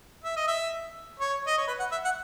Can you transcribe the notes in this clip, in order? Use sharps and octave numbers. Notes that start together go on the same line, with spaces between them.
E5
D#5
E5
C#5
D#5
C#5
B4
F#5
E5
F#5